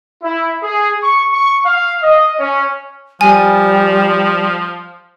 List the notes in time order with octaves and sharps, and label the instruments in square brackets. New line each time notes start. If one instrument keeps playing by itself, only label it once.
[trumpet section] E4
G#4
C#6
C#6
F5
D#5
C#4
[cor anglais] F3 [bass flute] G3 [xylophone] G#5